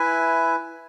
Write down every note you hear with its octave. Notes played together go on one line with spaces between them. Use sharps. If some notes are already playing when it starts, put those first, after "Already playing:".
Already playing: E4 B4 E5 G#5